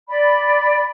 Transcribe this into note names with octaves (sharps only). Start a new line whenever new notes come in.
D5 B5